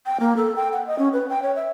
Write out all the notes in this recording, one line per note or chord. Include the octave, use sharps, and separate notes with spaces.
G5
A#3
A4
G5
F#5
D#5
C#4
B4
G5
C#5
E5